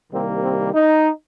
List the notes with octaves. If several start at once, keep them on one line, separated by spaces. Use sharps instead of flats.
C2 C3 D#3 G3 A#3 C4
C4
D#4